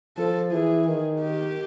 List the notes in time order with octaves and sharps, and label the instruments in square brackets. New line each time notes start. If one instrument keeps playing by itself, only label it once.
[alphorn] F3 [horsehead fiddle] A4
[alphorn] E3 [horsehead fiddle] G#4
[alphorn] D#3
[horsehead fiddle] G4